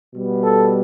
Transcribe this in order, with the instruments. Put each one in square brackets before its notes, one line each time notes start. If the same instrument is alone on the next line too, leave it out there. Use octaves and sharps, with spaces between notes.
[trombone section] B2 G3 B3
A4